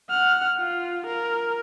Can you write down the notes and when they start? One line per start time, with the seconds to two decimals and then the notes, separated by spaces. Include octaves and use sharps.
0.10 F#5 F6
0.60 F4
1.06 A#4